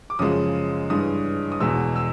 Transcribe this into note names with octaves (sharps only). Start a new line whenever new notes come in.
D6
F#2 C#3 F3 G#3 D#6
G2 E3 G#3 D#6
D#6
E2 B2 G#3 E6
E6